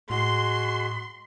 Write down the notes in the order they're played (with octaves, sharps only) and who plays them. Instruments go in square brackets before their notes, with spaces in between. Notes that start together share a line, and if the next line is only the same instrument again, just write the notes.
[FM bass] A2 [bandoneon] G#3 F#4 [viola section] C6